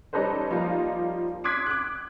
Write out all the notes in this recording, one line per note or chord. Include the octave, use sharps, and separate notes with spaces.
G3 C#4 D#4 A4 B4 C5
F3 G3 A#3 D#4 F4
C6 D6 D#6 F#6 G#6 B6
D6 F#6